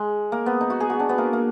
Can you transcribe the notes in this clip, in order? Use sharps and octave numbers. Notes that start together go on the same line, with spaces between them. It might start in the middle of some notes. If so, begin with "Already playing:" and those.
Already playing: G#3
A#3
B3
D#4
F#4
G#4
F#4
D4
B3
A#3
A#3